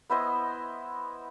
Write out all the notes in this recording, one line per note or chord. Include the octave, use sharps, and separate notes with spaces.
B3 E4 C5 D#5